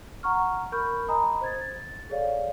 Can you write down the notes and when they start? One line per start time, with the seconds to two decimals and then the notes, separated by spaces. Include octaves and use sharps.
0.23 F#5 A#5 C#6 F6
0.72 A#4 B5 C#6 F6 G6
1.08 D#5 G#5 A#5 B5 D#6
1.41 C5 G#6 A6
1.61 A6
2.10 G#4 A4 C#5 D5 F5